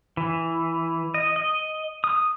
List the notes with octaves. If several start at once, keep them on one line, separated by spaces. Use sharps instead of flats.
E3
D#5
D#5
D#6